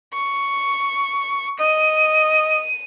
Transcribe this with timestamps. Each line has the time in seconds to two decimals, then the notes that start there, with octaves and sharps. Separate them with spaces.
0.13 C#6
1.60 D#5 D#7